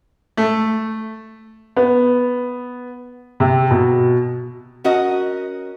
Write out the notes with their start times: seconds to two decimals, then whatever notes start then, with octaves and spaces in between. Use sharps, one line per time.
0.37 A3
1.76 B3
3.40 C3
3.71 B2
4.84 C#4 F#4 A#4 D#5